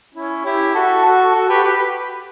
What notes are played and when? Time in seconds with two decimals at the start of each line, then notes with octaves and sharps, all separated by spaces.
0.15 C#4 E4
0.45 E4 G4
0.75 F#4 A4
1.04 F#4 A4
1.34 F#4 A4
1.49 G4 B4
1.64 G4 B4